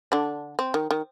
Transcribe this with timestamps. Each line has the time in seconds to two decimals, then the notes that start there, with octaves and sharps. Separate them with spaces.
0.12 D3 D4
0.59 C4
0.74 D#3
0.91 D#3